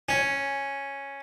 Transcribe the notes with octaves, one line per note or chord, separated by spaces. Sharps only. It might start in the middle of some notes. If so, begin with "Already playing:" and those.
C#4